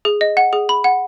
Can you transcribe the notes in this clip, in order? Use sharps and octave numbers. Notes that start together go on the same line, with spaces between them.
G#4
D#5
F#5
G#4
B5
F#5